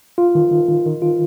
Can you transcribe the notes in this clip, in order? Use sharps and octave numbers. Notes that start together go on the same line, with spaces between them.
F4
D#3
D#3
D#3
D#3
F4